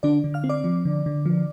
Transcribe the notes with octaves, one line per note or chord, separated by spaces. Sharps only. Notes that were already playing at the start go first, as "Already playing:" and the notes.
D3 D4 D5
D3
F5 F6
C4
D5 D6
F3
D3
D3
F3